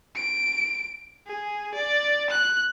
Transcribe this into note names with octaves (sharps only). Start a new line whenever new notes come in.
D7
G#4
D5
F#6